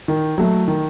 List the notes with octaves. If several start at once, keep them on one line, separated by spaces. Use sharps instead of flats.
D#3
F#3 A3
D#3